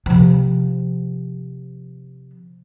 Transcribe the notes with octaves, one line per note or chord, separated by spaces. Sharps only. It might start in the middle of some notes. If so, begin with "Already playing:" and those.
C3 F3